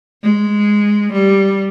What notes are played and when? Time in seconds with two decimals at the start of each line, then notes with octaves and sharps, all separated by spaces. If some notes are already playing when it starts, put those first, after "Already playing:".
0.23 G#3
1.13 G3